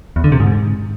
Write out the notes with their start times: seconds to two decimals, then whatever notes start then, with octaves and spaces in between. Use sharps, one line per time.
0.16 E2
0.24 D3
0.32 C3
0.40 G#2